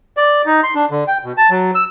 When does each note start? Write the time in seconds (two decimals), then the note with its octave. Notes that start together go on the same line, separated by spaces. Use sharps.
0.17 D5
0.46 D#4
0.63 C6
0.75 D4
0.91 D3
1.08 G5
1.24 B2
1.38 A5
1.50 F#3
1.75 E6